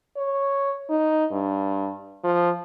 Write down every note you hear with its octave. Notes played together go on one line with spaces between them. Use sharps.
C#5
D#4
G2
F3